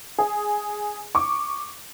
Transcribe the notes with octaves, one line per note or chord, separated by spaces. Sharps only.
G#4
C#6 D6